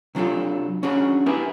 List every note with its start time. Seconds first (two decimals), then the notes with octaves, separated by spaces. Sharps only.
0.15 C3 F#3 D4 F4 A4
0.83 C#4 D4 F#4 G#4
1.26 B3 E4 G4 G#4 A#4 B4